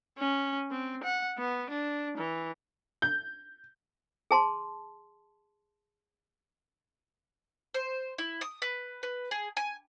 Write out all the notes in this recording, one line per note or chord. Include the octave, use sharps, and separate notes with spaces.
C#4
C4
F#5
B3
D4
E3
G6
G#4 A5 C6
C5
E4
D#6
B4
B4
G#4
G#5